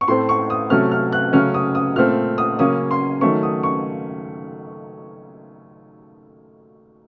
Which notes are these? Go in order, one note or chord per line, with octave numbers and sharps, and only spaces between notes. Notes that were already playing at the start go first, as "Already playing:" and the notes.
C#6
A2 A3 C4 C6
C#6
D#6
C3 F#3 A3 C#4 F6
F6
F#6
C#3 F#3 A3 C#4 F6
D#6
D#6
A#2 A3 C4 F6
D#6
C#3 F#3 A#3 C#4 D#6
C6
D#3 F#3 A3 C#4 C#6
D#6
C#6